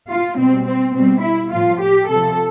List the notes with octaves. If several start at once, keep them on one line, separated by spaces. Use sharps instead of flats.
F4
B2 G3 C4
C4
B2 G3 C4
E4
A2 F3 F4
G4
C3 F3 A4